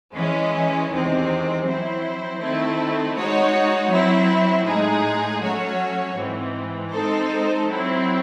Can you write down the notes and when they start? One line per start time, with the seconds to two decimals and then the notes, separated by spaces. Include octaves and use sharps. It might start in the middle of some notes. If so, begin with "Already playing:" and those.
0.15 E3 G#3 C#4
0.90 E2 C3 D#3 G#3 C4
1.64 F#3 C4 E4 C5
2.40 D#3 A3 C4 E4
3.14 G#3 D#4 F#4 C#5
3.90 F#3 C4 E4
4.65 A2 G#3 D#4 G#4
5.41 F#3 A3 C#4 F#4 C#5
6.15 G#2 E3 C4
6.90 G#3 C4 D#4 A4 C5
7.65 F#3 C4 E4